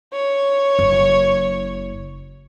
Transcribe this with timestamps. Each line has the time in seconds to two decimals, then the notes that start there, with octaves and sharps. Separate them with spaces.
0.13 C#5
0.79 F#1